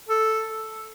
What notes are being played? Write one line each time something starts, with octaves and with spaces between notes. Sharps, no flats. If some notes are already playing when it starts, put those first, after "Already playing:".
A4